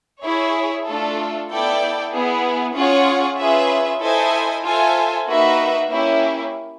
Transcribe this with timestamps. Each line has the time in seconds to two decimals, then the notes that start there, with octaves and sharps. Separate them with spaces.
0.24 E4 G#4 C#5
0.85 A3 D4 F4 A4
1.49 B3 E4 A4 D5 G5
2.12 B3 E4 G#4
2.74 C#4 F4 G#4 C#5 F#5
3.38 C#4 F4 G#4 B4 E5
4.00 E4 A4 C5 D#5 G#5
4.63 F4 A4 C5 E5 G#5
5.27 A#3 D#4 F#4 B4 E5
5.90 A#3 C#4 E4 G4